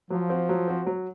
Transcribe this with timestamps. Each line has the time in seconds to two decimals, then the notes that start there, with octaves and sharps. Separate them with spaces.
0.10 F3 F#3
0.30 C4 F#4
0.49 F#3
0.68 C4 F#4
0.86 F#3